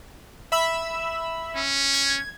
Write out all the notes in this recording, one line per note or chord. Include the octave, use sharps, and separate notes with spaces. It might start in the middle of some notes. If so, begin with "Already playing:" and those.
E5 B5 E6
C#4
G#6